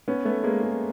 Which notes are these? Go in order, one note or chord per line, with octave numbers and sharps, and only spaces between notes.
B3 C#4
A3 B3
G#3 A#3
G#3